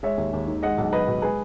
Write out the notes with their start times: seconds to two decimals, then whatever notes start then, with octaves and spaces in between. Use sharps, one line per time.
0.03 G#3 C#5 E5
0.18 D#2
0.33 D#2
0.47 D#3
0.63 G#3 D#5 F#5
0.78 B1
0.92 B1 B4 D#5
1.08 B2
1.22 G#3 G#4 B4